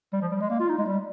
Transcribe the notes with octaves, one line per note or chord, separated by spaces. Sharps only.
G3
F3
G3
G#3
A#3
F4
D#4
G#3
G3